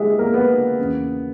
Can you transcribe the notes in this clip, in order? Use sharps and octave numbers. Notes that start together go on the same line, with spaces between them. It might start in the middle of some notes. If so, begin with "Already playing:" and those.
Already playing: A#2 G3 G#3 E4 G4 G#4 E5
A#3 A#4
B3 B4
E2 C#3 E3 A#3 C#4